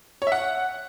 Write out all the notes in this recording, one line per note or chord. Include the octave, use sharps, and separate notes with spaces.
C#5
E5
F#5